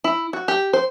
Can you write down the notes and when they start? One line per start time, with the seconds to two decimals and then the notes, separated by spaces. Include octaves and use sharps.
0.04 E4
0.33 F#4
0.48 G4
0.73 C5